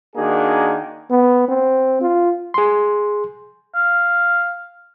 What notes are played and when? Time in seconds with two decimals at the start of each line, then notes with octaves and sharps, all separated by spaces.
0.16 D#3 A#3 D4 F#4 G#4
1.10 B3
1.48 C4
2.01 F4
2.54 G#4 C6
3.74 F5